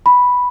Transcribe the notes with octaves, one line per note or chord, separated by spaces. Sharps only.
B5